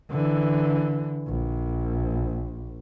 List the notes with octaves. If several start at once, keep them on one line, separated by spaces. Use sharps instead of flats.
D3 E3
A#1